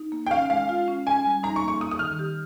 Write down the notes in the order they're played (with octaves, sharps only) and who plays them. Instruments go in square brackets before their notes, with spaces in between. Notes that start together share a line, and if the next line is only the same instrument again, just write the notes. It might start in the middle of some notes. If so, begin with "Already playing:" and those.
Already playing: [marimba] D#4
A#3
[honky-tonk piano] G5
[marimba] C#4 [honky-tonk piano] F5
[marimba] G#3 [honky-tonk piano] F5
[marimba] F4
C#4
[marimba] C#4 [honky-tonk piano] G#5
[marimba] G3
[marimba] D#4 [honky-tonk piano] A#5
[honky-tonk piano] C#6
[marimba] A#3
[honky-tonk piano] C#6
[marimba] A#3 [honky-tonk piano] D#6
[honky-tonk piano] D#6
[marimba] D#3 [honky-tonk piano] F6
[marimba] G4